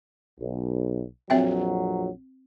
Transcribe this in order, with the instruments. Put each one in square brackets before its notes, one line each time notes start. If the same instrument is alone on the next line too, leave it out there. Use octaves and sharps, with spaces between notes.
[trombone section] B1
[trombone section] A#1 F2 F#3 [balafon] C4 E5 G5